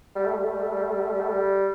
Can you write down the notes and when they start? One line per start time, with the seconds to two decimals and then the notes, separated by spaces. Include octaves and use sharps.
0.15 G3
0.25 A3
0.35 G3
0.43 A3
0.54 G3
0.62 A3
0.72 G3
0.82 A3
0.91 G3
1.01 A3
1.11 G3
1.20 A3
1.30 G3